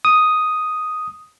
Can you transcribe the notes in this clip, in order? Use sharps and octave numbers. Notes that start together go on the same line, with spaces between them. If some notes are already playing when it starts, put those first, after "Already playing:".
D#6